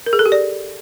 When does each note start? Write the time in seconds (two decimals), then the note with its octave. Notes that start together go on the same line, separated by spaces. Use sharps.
0.06 A#4
0.13 G#4
0.19 A4
0.26 G4
0.32 D5